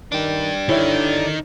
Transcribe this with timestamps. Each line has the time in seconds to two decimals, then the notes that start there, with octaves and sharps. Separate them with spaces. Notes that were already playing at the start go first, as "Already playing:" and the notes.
0.12 D#3 D4 G4
0.69 D3 D#3 E4 C#5